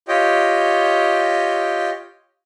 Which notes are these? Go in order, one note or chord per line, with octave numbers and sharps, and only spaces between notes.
F4 G4 C#5 D#5 G5